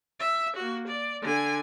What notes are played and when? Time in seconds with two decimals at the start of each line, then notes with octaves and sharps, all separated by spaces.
0.20 E5
0.56 A#3 F#4
0.87 D5
1.22 D3 G#5